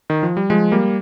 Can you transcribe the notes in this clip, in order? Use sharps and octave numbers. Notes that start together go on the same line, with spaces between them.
D#3
F3
G3
F3 G#3
G3 A#3